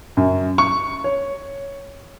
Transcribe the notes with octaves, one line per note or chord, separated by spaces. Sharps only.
F#2
C#6
C#5